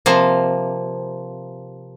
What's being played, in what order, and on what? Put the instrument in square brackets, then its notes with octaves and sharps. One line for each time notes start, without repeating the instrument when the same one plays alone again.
[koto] C3 F3 A#3